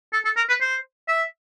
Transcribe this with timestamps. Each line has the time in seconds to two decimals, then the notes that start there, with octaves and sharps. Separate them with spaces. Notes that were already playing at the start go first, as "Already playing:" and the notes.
0.13 A4
0.25 A4
0.37 A#4
0.49 B4
0.61 C5
1.08 E5